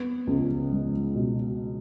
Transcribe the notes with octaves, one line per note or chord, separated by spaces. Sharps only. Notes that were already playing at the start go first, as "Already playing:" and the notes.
Already playing: B3
C#2
G#3
B2